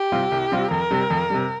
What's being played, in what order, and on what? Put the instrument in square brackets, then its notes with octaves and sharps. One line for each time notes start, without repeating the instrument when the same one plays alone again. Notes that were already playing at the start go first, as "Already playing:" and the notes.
Already playing: [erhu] G4
[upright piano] C3 G3 C4 F4
C2
C3 G3 C4 F4
[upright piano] F2 [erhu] A#4
[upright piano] C3 G3
F2
C3 G3